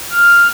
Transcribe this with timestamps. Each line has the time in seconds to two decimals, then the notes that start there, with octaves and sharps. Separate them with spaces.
0.10 F6